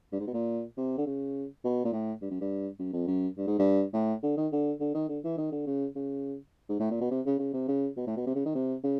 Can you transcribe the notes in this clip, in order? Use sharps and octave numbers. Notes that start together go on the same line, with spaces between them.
G2
G#2
B2
A#2
C3
D3
C#3
B2
A#2
A2
G2
F#2
G2
F#2
F2
F#2
G2
G#2
G2
A2
D3
D#3
D3
D3
D#3
D3
E3
D#3
D3
C#3
C#3
G#2
A2
A#2
B2
C3
C#3
C#3
C3
C#3
B2
A2
B2
C3
C#3
D#3
C3
C#3